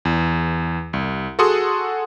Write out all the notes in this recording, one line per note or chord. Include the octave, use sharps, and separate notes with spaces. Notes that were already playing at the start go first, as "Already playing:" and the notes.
E2
C2
F#4 G#4 A4 F#5 C6 D#6